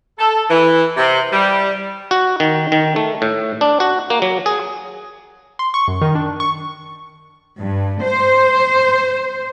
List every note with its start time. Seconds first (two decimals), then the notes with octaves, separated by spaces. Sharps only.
0.19 A4
0.50 E3
0.97 C3
1.33 G3
2.11 F#4
2.40 D#3
2.72 D#3
2.96 A3
3.22 A2
3.61 D4
3.80 F#4
4.10 A#3
4.22 F#3
4.46 G#4
5.59 C6
5.74 C#6
5.88 F#2
6.01 D#3
6.15 D4
6.40 C#6
7.58 G2
8.03 C5